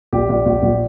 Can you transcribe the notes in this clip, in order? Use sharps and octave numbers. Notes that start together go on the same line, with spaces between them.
A#1 G4
A#1
A#1
A#1